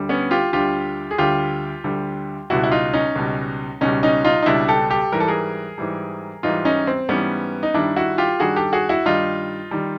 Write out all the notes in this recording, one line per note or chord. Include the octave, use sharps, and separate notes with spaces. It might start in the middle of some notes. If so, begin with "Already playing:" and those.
Already playing: D2 D3 G3
B3 C#4
F4 G4
D2 D3 G3 F4 G4
G#4
D2 D3 G3 F4 G4
D2 D3 G3
C#2 B2 G3 E4 F#4
E4
D#4 F4
C#4 D#4
C#2 B2 G3
C#2 B2 G3 C#4 D#4
C#4 D#4
D#4 F4
D#4
C#2 B2 G3 D4 E4
G4 A4
G4 A4
G#2 E3 G3 A#4
A4
G#4 A#4
G#2 E3 G3
G#2 E3 G3 D#4 F4
C#4 D#4
C4
G#2 E3 G3 B3 C#4
D#4
G2 D#3 G3 D4 E4
E4 F#4
F4 G4
G2 D#3 G3 F#4 G#4
G4 A4
F#4 G#4
E4 F#4
G2 D#3 G3 D#4 F4
D#3 G3